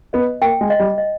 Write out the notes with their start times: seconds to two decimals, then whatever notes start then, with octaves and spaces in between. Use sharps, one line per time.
0.13 B3 D#5
0.42 A#3 G5
0.61 G#3
0.70 D#5
0.79 G3
0.98 D#5